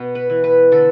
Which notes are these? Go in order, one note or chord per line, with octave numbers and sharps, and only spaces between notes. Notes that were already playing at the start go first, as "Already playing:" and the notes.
Already playing: B2 B3
B4
E3
B4
D3 A4